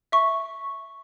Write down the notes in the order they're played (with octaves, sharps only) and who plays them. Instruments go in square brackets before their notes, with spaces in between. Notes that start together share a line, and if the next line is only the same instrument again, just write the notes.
[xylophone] E5 C#6